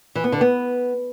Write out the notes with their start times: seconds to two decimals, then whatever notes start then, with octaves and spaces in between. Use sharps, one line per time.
0.15 E3
0.24 B3
0.32 D3
0.41 B3